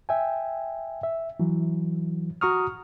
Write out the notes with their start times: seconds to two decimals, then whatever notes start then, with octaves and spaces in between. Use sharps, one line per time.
0.09 E5 G5 G#5
1.03 E5
1.40 E3 F#3
2.41 F#4 A#5 C#6 D#6 F6